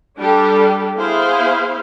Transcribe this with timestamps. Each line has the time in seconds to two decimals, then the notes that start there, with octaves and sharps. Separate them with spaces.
0.18 G3 D4 G4 A4
0.97 B3 E4 G#4 C5 F5